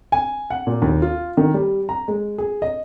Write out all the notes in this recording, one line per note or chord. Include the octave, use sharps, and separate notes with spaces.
G#5
F#5
A#2
D#2
F4
D#3
G3
A#5
G#3
G#4
D#5